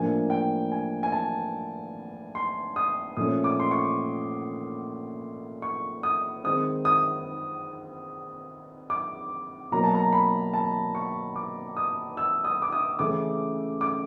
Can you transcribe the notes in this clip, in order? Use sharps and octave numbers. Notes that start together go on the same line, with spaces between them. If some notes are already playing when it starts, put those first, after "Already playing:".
Already playing: A2 F3 A#3 D4 G#5
G5
G#5
G#5
A5
C6
D#6
A#2 F3 A3 C#4 D#6
D6
C6
C#6
C#6
D#6
D#3 G#3 C4 D#6
D#6
D6
B2 F#3 A#3 A#5
A5
A#5
B5
A5
C#6
D6
D#6
E6
D#6
D6
D#6
C#3 E3 A3 C#4 D6
D6